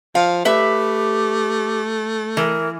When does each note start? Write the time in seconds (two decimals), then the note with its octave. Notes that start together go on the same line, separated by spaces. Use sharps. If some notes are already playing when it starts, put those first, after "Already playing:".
0.15 F3 F5
0.45 A3 G4 B4 E5
2.37 E3 A#4